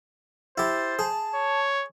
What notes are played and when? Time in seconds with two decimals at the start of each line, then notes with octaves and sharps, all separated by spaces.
0.58 E4 G4 C5 A6
0.99 G#4 A5
1.35 C#5